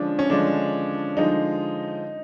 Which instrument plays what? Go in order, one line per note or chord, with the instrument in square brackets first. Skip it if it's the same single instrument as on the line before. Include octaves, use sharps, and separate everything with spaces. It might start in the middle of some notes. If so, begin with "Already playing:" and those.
Already playing: [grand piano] D3 F3 G#3 [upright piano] C#4 D4
[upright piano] C#4
[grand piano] D3 F3 G#3 [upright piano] D4
[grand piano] D3 F3 G#3 [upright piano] D#4